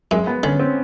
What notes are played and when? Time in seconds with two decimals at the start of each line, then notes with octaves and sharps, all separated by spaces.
0.11 F#2 G#3
0.27 B3
0.43 D3 C#4
0.60 C4